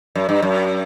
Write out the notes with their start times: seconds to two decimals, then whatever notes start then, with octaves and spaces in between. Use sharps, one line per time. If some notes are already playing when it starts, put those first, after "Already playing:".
0.15 F#2
0.29 G2
0.42 F#2